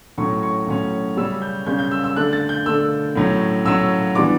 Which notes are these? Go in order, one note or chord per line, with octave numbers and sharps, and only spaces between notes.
A2 F#3 C#4 C#6
C#6
A2 F#3 C#4
C#3 G3 C#4 E6
G6
C#3 G3 C#4 G6
G6
E6
E6
D3 A3 D4 F#6
A6
G6
D3 A3 D4 E6
A2 F#3 C#4
A2 F#3 C#4 E6
E3 G3 B3 D4 D6